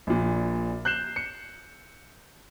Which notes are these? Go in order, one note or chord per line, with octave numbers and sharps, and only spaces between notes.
A#1 A#2
F#6 G6 C7 E7
C#7